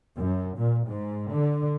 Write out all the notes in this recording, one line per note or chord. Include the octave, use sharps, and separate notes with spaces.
F#2
A#2
G#2
D3